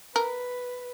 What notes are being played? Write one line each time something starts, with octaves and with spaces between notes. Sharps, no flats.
A#4 B4